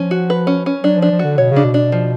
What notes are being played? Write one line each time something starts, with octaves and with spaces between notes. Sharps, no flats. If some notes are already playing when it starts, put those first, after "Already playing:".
Already playing: F3 C#4
F#4
B4
C#4
C#4
F#3 D4
F3
D4
F3
D3 F#4
B2 C#5
C#3
D4
B2
D4
F3